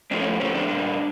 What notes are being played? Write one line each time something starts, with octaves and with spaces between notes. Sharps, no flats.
A2 F3 A3 C4 D4
C#4
A2 F3 A3 C4 C#4
D4
A#2 G3 A#3